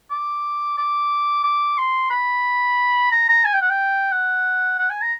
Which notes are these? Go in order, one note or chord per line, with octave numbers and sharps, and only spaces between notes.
D6
D6
D6
C6
B5
A#5
A#5
G#5
G5
F#5
G5
F#5
F#5
G#5
A#5